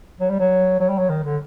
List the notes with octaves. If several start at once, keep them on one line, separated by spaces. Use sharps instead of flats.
F#3
G3
F#3
F#3
G3
F#3
D#3
D3